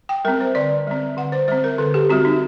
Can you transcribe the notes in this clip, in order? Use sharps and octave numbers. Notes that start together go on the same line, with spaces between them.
G5
G3 C4 A#4
C5
D3 D5
G3 C4
D3 F#5
C5
G3 C4 C5
A#4
D3 A4
G4
G3 C4 F#4
D#4